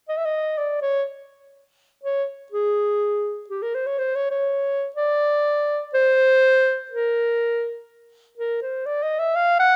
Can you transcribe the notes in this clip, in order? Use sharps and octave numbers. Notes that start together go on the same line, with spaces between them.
D#5
E5
D#5
D5
C#5
C#5
G#4
G4
A#4
C5
C#5
C5
C#5
C#5
D5
C5
A#4
A#4
C5
D5
D#5
E5
F5
F#5